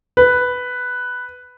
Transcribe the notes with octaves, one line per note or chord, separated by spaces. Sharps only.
B4